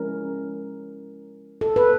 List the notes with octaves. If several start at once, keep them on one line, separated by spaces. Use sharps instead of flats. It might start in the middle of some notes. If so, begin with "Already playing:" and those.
Already playing: F3 G#3 C#4 E4 A#4
A4
B4